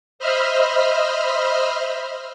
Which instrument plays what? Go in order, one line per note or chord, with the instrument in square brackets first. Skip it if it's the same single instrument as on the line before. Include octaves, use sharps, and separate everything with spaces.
[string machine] C5 D#5 E5 B5 F6